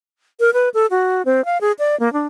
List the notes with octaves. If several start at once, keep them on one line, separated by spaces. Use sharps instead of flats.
A#4
B4
A4
F#4
C4
F5
G#4
D5
A#3
D4